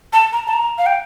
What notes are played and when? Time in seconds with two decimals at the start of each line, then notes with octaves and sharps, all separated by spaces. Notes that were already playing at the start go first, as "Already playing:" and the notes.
0.13 A5
0.33 A#5
0.47 A5
0.53 A#5
0.78 F5
0.86 G5